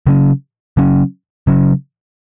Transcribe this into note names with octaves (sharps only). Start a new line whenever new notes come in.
C#3 F#3 C#4
C#3 F#3 C#4
C#3 F#3 C#4